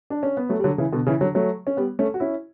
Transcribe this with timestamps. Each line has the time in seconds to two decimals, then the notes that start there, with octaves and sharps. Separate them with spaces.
0.10 D4
0.23 C#4
0.37 B3
0.49 F#3 A3
0.59 G3
0.64 D3 F#3
0.78 C#3 E3
0.92 B2 D3
1.06 C#3 E3
1.21 D3 F#3
1.35 F#3 A3
1.67 C#4
1.77 G3 B3
1.99 A3 C#4
2.14 F#4
2.20 C#4 E4